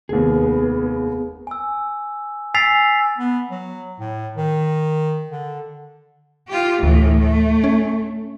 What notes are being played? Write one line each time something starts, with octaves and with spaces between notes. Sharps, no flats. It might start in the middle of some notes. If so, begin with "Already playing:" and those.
F1 D#2 B3 G#4
G#5 E6
G#5 E6 A6 B6 C7 F7
B3
F#3
A2
D#3
D3
F4 G4
D2 A2 E3
A3
C#4